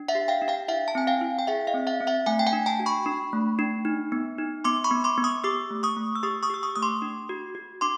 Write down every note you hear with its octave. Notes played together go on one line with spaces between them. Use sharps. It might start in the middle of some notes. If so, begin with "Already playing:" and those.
Already playing: D4
E5 F#5
G4
F5 G5
D4
F5 G5
E4 E5 F#5
A5
C4 G#5
F5 G5
E4
G5
G#4 E5 F#5
D#5 F5
C4
E5 F#5
C4
E5 F#5
A3 F#5 G#5
G5
F#5 G#5
D4
G5 A5
F#4
B5 C#6
D4
A3
D4
D#4
B3
D#4
B3 C6 D6
B5 C#6
B3
C6 D6
B3
C#6 D#6
G4 D6 E6
A3
C#6 D#6
A3
E6
G4 C#6 D#6
C#6 D#6
G4 E6
C#6 D#6
A3 D#6
C6 D6
D4
F#4
F#4
D4 C6 D6